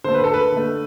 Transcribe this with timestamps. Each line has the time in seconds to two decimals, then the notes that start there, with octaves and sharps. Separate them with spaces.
0.04 D3 A3 C5
0.14 B4
0.24 A4
0.34 B4
0.52 D3 A3